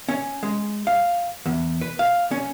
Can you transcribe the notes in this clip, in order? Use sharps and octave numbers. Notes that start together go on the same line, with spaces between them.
C#4
G#3
F5
E2
B4
F5
C#4